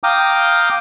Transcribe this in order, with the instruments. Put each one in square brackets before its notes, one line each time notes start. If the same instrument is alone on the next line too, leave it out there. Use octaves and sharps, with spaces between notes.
[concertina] F5 G5 A#5 D6 D#6